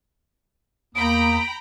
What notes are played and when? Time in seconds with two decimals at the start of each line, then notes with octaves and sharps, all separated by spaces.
0.95 E2 A#3 G5 A#5 B5 D#6 D7